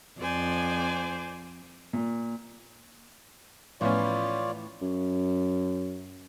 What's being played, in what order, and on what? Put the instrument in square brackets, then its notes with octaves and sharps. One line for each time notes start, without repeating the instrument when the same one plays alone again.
[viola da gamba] F2 [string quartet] C5 D5 G#5
[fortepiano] A#2
[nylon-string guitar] A2 E3 [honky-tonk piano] F3 B3 C#4 [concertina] F4 C#5 D5
[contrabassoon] F#2